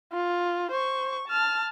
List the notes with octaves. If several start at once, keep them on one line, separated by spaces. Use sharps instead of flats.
F4
C5 C#6
A5 F6